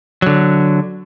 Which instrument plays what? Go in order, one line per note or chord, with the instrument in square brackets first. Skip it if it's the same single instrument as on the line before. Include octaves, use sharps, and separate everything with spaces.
[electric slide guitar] D3 F#3